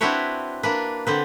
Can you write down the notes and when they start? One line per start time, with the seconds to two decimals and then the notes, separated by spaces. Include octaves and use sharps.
0.01 C4 D4 E4 F#4 B4 C#5
0.63 A#3 D4 B4
1.07 D3 C4 B4